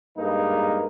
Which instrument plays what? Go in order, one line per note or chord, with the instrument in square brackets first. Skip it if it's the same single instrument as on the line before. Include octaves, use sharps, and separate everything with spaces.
[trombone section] G2 G#3 A#3 D#4 A#4 B4